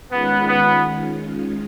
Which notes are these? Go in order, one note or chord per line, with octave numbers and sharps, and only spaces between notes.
D#3 G#3 B3 C#4 F4
B3